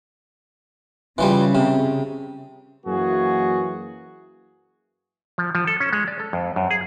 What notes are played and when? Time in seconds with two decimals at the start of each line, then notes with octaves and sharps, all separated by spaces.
1.18 C#3 E3 F3 G3
1.55 C3
2.85 F#2 E3 A#3 F#4 G#4
5.38 F3
5.55 F3
5.67 A4
5.80 C#4
5.93 G#3
6.08 D5
6.20 A4
6.33 F2
6.56 F#2
6.71 G#4